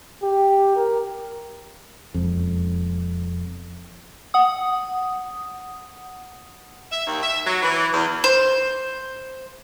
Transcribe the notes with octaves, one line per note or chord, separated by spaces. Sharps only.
G4
A#4
E1 F2
F#5 D#6
E5
D#2
E5
F#3
E3
E2
C5